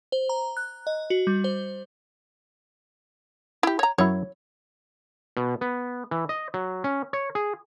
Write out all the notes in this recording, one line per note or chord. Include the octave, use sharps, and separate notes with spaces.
C5
A#5
F#6
D#5
F#4
G3
C5
E4 G4
C#5 A#5
F#2 F#3 E4 C#5
B2
B3
E3
D#5
F#3
C#4
C#5
G#4